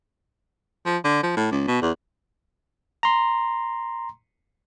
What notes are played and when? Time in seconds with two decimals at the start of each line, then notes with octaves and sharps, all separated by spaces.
0.86 F3
1.05 D3
1.23 F3
1.37 A2
1.51 C#2
1.68 B2
1.82 E2
3.03 A#5 C6